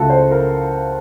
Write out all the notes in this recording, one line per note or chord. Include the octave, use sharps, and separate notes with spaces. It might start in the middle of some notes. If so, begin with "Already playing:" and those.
Already playing: C#2 C#3 A3 F#4 A4
C5
A#4